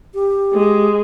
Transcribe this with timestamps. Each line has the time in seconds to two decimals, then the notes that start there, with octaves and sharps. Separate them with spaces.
0.14 G4
0.54 G#3